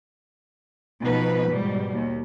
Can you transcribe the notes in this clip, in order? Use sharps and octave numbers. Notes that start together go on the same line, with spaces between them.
B2 F3 D#4 B4
G#2 B2 G3
D#2